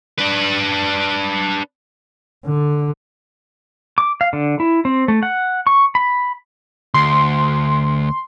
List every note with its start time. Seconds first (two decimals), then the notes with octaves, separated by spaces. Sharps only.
0.18 D4 B4
2.46 D3
3.98 D6
4.21 F5
4.33 D3
4.60 E4
4.85 C4
5.08 A3
5.23 F#5
5.67 C#6
5.95 B5
6.94 D2 C6